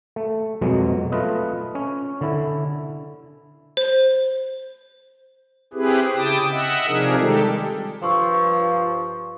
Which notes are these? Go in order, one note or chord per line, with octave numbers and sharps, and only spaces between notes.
A3
F2 B2 F#3 G#3
A3 F4 B4 D#5
C#4
D3 E4
C5
C4 E4 G4 G#4 B4
C#3 E4 G5 A5 D6 D#6
D#5 E5 F#5 E6
C3 F3 D4 D#4 G#4 A#4
D#3 G3 G#3 G4 A4
G2 F3 C6 C#6 E6